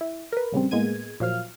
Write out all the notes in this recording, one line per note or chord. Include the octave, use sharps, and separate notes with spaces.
E4
A#4 B4
A#1 C#3 G3 C4
A2 G#3 A#3 B3 G#6 D#7
A#2 F3 F#3 F5 F6